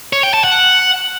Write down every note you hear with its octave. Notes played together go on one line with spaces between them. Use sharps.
C#5
G5
A5
F#5